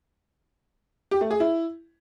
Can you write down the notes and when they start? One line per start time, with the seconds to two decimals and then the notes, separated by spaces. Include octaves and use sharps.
1.11 G4
1.21 A3
1.31 G#4
1.40 E4